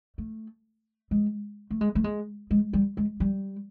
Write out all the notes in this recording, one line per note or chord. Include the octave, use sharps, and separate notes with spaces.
A3
G#3
A3
G#3
A3
G#3
G#3
G3
G#3
G3